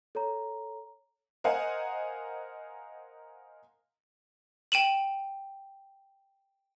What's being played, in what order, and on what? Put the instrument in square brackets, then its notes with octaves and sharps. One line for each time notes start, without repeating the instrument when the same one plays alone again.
[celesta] A4 C#5 A#5
[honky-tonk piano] A#4 C5 D#5 F5 F#5 G#5
[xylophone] G5 D#7 E7 F#7